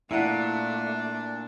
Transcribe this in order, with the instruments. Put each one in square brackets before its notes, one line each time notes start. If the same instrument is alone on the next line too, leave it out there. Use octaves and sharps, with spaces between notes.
[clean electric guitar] A#2 [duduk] A3 [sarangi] D4 [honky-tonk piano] E4 F#5